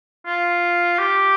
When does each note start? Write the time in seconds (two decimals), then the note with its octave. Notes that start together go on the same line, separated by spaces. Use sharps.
0.26 F4
0.99 G4